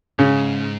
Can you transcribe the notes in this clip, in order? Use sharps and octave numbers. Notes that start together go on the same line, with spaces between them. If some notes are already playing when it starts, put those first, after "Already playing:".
G#2 C#3